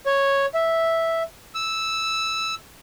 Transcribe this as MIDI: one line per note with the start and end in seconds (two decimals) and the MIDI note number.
0.06 0.46 73
0.54 1.23 76
1.55 2.55 88